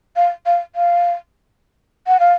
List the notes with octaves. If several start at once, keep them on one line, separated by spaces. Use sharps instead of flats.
F5
F5
F5
F#5
F5